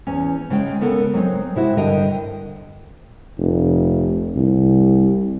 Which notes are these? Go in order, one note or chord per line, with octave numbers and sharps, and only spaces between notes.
E2 C#4
C#3 G#3 G5
C#3 B3 A4 A#4
F#3 G#3 C4 D#4
C3 E4 F#4
G2 D3 A#4 D#5 G5
F1
C2